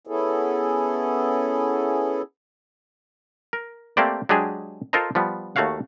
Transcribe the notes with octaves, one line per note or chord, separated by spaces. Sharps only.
B3 C#4 E4 G#4 A4
A#4
A3 A#3 C4 G4 C5 D5
F#3 G#3 D4 G4 G#4
F4 A4 A#4 C5 D#5 A#5
F3 G3 B3
D#2 A3 F#4 C#5 F5 F#5